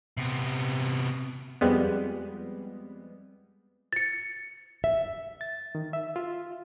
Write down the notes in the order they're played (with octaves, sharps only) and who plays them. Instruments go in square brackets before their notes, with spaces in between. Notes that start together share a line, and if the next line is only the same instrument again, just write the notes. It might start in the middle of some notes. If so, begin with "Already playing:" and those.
[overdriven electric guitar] C3 B3
[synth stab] F2 G3 G#3 B3
[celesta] A6 C#7
[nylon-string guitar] E5
[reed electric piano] A6
D#3
E5
F4